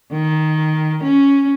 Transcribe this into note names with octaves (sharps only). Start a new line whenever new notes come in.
D#3
C#4